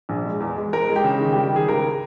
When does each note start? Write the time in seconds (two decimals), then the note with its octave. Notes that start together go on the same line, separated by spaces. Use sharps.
0.09 A#1
0.25 G#3
0.40 E2
0.56 G#3
0.73 G#3 A#4
0.89 G#3
0.96 G4
1.04 C#3
1.20 D#3
1.33 G4
1.36 G3
1.43 G4
1.52 D#3 G#4
1.68 C#2 A#4